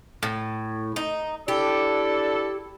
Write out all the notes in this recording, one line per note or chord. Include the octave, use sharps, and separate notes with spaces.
A2
D#4
D4 E4 G4 A4